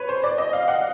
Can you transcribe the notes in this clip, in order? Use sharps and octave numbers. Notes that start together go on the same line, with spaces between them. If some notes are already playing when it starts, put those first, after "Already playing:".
Already playing: B4 C#5
C5
D5
D#5
F5
F#5